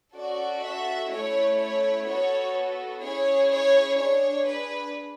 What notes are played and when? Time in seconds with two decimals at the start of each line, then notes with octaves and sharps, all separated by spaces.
0.16 C#4 F#4 A4 D5
0.64 E5
1.12 A3 C#4 E4 C#5
1.59 C#5
2.07 B3 F#4 A4 C#5
3.03 C#4 E4 G#4 C#5
3.51 C#5
3.98 D4 G#4 C#5
4.46 B4